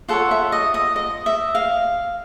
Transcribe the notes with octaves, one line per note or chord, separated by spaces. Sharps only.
F4 A4 C#5 F#5
E5
D#5
D#5
D#5
E5
F5